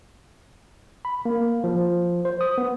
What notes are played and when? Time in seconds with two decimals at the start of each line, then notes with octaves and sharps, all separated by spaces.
1.05 B5
1.25 A#3
1.64 F3
2.25 C5
2.41 D#6
2.58 B3